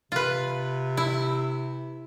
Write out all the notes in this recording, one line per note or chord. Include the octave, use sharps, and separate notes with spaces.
C3 F4 B4
E4